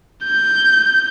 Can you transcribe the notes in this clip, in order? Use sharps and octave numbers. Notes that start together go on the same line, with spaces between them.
G6